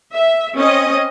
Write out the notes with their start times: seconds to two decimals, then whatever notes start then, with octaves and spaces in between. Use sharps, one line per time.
0.13 E5
0.57 C4 C#4 D#5